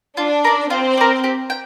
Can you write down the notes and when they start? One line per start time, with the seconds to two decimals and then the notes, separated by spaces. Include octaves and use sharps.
0.17 D4 F4
0.45 A#4 D5
0.70 C4 F4
0.97 A#4 D5
1.24 G4
1.50 G5